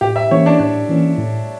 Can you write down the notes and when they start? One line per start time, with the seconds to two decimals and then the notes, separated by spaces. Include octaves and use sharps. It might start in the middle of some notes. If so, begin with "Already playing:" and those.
0.01 A2 G4
0.16 E5
0.31 E3 A#3 C#4 C#5
0.46 D4
0.59 A2 D4
0.89 E3 A#3 C#4
1.18 A2